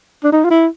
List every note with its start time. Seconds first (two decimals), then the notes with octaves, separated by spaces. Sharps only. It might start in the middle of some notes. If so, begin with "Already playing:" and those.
0.24 D4
0.33 D#4
0.45 F4
0.51 E4